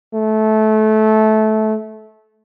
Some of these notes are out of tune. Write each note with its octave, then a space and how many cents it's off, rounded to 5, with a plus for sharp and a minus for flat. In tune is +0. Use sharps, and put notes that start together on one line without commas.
A3 -20